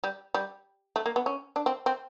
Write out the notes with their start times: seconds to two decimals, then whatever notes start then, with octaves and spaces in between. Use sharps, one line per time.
0.04 G3
0.34 G3
0.96 A3
1.06 A#3
1.16 B3
1.26 C#4
1.56 D4
1.66 C4
1.86 C4